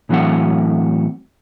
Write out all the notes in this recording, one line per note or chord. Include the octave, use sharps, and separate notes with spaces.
A2 E3 F#3 A3 C4 F#5